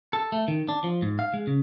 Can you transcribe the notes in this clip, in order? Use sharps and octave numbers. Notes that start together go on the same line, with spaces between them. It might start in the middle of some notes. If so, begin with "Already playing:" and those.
A4
A3
D#3
D4
F3
G#2
F5
G#3
C#3